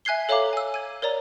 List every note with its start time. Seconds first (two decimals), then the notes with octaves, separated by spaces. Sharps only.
0.05 E5 G#5 F#6 G#6 C7 G7
0.29 A4 C#5 E5 F5 A#5 D6
0.53 G#5 E6
0.74 G#6 D#7
1.02 A#4 C#5 D5 A#5